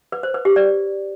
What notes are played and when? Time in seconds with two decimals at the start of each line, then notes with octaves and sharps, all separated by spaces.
0.12 B4
0.23 C5
0.34 B4
0.45 G4
0.56 D5